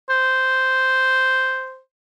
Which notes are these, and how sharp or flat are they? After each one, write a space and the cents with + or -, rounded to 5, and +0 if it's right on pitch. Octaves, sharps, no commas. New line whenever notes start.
C5 -5